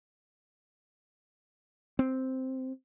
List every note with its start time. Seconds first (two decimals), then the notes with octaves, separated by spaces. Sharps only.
1.99 C4